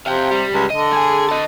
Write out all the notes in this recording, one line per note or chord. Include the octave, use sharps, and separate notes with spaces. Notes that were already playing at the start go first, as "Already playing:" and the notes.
C3 F5 G5
G3
C#2
D3 D#5
G#4 G#5
D#5 A5